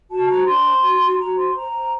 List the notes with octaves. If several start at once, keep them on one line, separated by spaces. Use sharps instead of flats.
F#4 A5
C5 A#5
D4 C6
C5
F#4
F#4
F#4 A#5
C5 C6
C5 A#5
C5